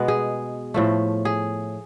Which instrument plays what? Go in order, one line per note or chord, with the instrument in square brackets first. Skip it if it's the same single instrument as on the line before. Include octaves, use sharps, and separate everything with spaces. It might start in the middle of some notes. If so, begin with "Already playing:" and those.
Already playing: [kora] B2 G#3 B3
G#4
A2 F3 A3
G#4